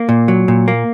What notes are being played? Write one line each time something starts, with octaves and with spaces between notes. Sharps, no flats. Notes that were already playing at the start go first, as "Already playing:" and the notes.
Already playing: A#3
A#2
F#3
A#2
A#3